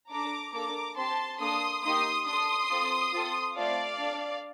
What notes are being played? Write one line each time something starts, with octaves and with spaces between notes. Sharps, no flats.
D4 A4 A#5 D6
A#3 D4 A4 A#5 D6
C4 G4 A5 C6
A#3 D4 A4 C6 D#6
A#3 D#4 G4 C6 D#6
D4 A4 C6 D#6
C4 F4 A4
C4 F4 A4
A3 C4 F4 A4 D5 F5
D4 A4